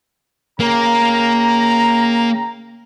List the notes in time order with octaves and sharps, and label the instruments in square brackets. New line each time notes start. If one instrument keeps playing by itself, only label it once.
[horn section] C#3 G5 A#5 [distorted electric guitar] A#3